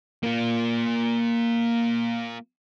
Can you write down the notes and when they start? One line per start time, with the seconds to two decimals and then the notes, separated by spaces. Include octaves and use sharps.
0.23 A#3 F4